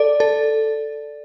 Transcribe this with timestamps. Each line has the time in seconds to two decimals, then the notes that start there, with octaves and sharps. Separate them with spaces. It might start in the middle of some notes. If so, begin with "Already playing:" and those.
Already playing: A4 D5
0.20 A4